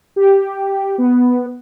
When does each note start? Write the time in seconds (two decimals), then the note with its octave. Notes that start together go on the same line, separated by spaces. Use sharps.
0.16 G4
0.98 B3